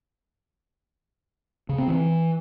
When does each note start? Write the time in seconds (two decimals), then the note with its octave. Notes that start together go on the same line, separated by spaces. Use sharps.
1.69 C#3
1.78 C4
1.88 E3